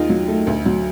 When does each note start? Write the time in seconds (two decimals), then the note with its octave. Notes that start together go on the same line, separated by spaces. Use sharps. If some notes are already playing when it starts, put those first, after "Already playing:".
Already playing: D#2 G#3 D#4 F4
0.09 F#3
0.28 A3
0.47 D2
0.65 F#3